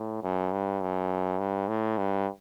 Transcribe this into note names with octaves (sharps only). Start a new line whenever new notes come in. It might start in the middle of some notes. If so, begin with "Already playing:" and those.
Already playing: A2
F#2
G2
F#2
G2
A2
G2